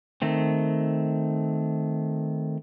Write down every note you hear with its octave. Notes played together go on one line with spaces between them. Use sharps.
D#3 A3 C4